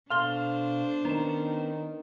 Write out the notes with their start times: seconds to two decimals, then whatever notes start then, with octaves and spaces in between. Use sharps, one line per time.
0.10 B2 D4 A4 C5 F5 C6 F6 G7
1.05 D#3 B3 C#4 A#5 E7